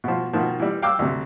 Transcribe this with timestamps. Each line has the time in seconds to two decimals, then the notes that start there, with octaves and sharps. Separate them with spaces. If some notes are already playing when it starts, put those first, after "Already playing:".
0.04 B2 F3
0.33 B2 D#3 F3
0.60 E3 G3
0.82 F5 G5 D6 E6
0.99 D2 C3